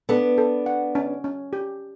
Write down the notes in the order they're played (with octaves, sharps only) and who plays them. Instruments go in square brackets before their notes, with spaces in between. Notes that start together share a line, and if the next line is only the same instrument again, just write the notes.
[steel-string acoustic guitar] B3 D4 [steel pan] A4
[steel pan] A4
F#5
C#4
C#4
G4